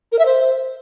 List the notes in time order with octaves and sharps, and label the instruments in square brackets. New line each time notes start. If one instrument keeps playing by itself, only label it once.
[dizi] A#4
E5
C5